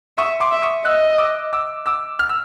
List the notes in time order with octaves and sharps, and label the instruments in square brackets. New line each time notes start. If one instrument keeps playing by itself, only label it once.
[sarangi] E5 [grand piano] C#6 D#6
[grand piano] C6 D6
[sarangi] E5
[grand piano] C#6 D#6
[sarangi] D#5 [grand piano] E6 F#6
[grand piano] D6 E6
D6 E6
D6 E6
F6
E6